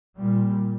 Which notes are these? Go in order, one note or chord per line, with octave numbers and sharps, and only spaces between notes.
A#2 G3